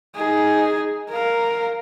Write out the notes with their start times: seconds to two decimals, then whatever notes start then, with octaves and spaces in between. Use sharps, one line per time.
0.16 D#4 G#4
1.10 A#4 F5